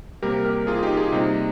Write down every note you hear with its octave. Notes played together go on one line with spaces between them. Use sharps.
C3 G3 A#3 G4 A#4
G4 A#4
F4 G#4
D#4 G4
F4 G#4
C3 G3 A#3 D#4